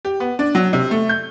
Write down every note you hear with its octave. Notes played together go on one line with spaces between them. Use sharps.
G4
B3
D4
F#3
C3
A3
G6